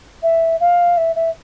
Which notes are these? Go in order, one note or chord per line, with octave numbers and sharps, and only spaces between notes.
E5
F5
E5
E5